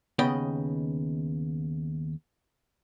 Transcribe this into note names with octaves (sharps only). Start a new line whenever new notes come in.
D#2 C#3 B3 D#5 G5 B5